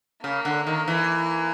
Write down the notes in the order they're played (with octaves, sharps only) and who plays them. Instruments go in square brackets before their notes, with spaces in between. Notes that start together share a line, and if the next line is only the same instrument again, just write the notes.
[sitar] C#3 [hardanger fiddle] A#3
[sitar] D3
D#3
E3